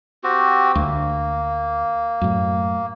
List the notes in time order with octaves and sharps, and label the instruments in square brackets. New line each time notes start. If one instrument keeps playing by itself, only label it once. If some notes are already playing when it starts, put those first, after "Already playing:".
[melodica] C4 F#4 G4
[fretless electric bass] D2 [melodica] A#3
[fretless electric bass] F#2 A2